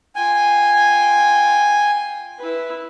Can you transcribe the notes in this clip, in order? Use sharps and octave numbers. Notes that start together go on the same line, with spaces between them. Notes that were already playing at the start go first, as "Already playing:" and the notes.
F4 G5 G#5
E4 B4